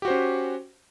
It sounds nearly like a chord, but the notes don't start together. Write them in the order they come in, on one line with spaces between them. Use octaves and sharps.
G4 F#4 C5 C#4